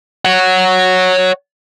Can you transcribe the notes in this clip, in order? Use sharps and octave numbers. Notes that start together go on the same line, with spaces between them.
C#5 F#5